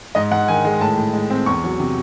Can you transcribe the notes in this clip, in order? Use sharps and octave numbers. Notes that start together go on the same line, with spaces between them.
G#2 D#5
G#2 F#5
D#3 G#5
G#3
A2 A5
A2
G#3
C4
E2 C#6
F#3
C3